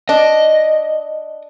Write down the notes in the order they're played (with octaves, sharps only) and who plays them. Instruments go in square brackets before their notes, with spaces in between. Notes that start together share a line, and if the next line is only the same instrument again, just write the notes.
[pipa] D4 [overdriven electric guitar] D#5